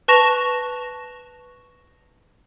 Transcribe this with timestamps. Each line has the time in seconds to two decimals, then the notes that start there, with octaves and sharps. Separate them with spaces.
0.08 B4 A5 C#6 A#6 E7 F7